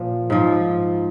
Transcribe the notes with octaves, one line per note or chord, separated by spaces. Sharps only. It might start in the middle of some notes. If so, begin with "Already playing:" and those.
Already playing: A#2 F3
G#2 F3